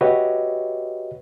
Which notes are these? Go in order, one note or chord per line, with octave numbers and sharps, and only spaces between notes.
F#4 G4 B4 C#5 D#5 E5